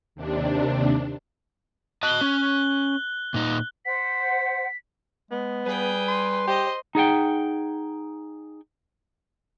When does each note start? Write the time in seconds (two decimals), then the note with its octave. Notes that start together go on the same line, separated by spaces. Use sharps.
0.15 D#2 C3 D4
2.03 D#5 A5 F#6 F#7 G7
2.21 C#4
3.34 A#2 D#4
3.85 C5 F#5 B6
5.31 G#3 B3
5.66 G3 G#4 B4 G5
6.09 C6
6.47 G4 C5 D#5
6.95 D#4 G#4 F#5 G5